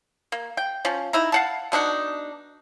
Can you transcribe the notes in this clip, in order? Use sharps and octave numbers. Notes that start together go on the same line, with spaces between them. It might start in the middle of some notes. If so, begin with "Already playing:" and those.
A#3
G5
F3 C#4
D#4 E4 A#5
F5 F#5 A5
B2 D4 D#4 F#5